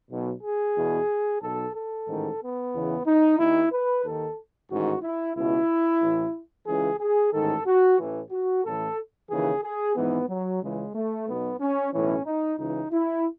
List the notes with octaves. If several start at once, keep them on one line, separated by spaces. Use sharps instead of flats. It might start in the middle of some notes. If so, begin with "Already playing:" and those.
B1 B2
G#4
E2 B2
B1 B2 A4
A4
A1 G#2 D#3
B3
E2 C#3 E3
D#4
D#2 D#3 E4
B4
D#2 D#3 A4
A1 G#2 D#3 F#4
E4
C#2 B2 E4
A1 A2 E3
C#2 C#3 E3 G#4
G#4
A1 G#2 D#3 A4
F#4
A1 A2 E3
F#4
A1 A2 E3 A4
D#2 C#3 E3 G#4
G#4
G#1 G#2 E3 B3
F#3
C#2 C#3 E3 G#3
A3
B1 B2 B3
C#4
B1 A2 E3 C#4
D#4
C#2 C#3 E3 D#4
E4